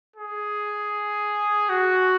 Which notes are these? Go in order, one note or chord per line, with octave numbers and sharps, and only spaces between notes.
G#4
F#4